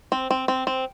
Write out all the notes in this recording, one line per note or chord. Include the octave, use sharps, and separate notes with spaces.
C4
C4
C4
C4